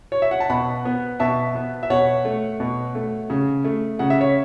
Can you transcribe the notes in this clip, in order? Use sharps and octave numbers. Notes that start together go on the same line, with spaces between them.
C#5
E5
F#5
A5
B2 F#5 B5
B3
B2 E5 A5
B3
E5
B2 C#5 F#5
A3
B2
A3
C#3
A3
C#3 F#5
E5
C#5